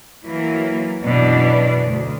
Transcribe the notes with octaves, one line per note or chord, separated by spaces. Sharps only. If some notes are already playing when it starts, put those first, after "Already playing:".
E3 F#3 A#3
F#2 B2 E3 D4 D5
D2